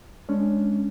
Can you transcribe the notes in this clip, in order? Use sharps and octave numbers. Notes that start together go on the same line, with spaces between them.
G#3 C#4 D4